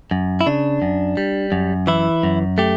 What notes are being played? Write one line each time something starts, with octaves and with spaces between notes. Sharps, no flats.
F#2
E4
C#3 D4
F#2
G3
F#2
E3 E4
F#2
A3 G4